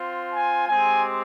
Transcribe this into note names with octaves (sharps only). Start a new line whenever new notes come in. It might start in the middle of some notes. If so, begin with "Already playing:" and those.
Already playing: C4 F4
G#5
G#3 C4 G4 G#5